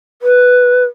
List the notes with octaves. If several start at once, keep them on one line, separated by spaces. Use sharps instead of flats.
B4